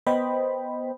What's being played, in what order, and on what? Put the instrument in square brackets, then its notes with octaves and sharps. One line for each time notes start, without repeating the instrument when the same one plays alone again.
[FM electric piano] B3 C5 D#5 G5 B5